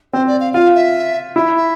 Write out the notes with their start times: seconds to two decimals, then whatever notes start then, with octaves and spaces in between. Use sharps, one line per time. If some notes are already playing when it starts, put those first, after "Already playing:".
0.13 C4 C5
0.27 D5
0.40 F5
0.54 F4 F5
0.75 E5
1.36 E4 E5
1.56 E5